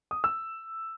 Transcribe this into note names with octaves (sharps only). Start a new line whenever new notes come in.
D#6
E6